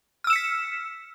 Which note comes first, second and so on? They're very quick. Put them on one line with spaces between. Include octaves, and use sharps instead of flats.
F6 E6 E7 C#7 B6